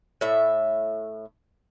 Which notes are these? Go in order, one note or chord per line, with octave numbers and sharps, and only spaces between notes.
A2 E5